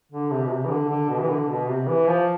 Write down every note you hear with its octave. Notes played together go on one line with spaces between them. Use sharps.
D3
C3
B2
C3
E3
D3
D3
B2
E3
D3
B2
C3
E3
F3